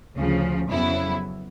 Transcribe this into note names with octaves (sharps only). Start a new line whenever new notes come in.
D2 C#3 F3
F2 C#3 F#3 B3 E4